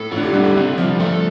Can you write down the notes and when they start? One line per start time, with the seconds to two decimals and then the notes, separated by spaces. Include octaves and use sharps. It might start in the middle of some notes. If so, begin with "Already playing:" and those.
Already playing: A2 A4
0.11 A2 F4
0.17 D3
0.23 C3
0.33 D3 G3
0.45 C3
0.56 D3 C4
0.78 F3 G3
1.00 A3 A4